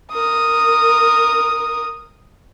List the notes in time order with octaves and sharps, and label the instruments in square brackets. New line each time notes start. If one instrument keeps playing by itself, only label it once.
[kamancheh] A#4 D#6